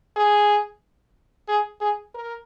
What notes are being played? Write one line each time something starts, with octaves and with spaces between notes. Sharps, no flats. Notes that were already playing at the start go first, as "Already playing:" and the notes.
G#4
G#4
G#4
A#4